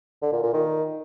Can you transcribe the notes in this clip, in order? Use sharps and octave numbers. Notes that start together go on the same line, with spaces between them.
D3
A#2
A#2
D#3